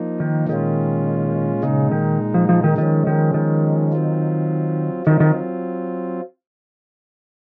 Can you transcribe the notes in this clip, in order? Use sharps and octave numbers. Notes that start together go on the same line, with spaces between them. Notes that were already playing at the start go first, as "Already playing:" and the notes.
Already playing: F3 A#3 D#4
D#3
A#2 D#3 G#3 C#4 F4
A#2 C#3 G#3 D#4
D#3
F3
F3
D#3
D#3 F3 G#3 C#4
D#3
D#3
F#3 C4 F4
D#3 F#3 C4 F4
D#3